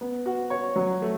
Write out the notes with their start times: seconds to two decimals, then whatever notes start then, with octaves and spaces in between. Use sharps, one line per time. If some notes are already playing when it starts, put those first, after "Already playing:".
0.01 B3
0.26 F#4
0.50 C#5
0.76 F#3
1.02 A3